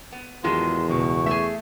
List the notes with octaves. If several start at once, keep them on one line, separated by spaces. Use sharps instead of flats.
B3
E2 A2 D#3 F#3 G#3 F4 G4 C6
C#2 B2 C#6
A3 G#4 E5